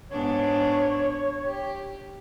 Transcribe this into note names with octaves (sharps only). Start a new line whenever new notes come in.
G#2 B3 D4 C#5
G4